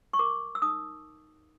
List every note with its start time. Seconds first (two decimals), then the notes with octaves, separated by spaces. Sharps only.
0.13 C#6
0.19 A#4 D6
0.55 E6
0.62 D#4 D#6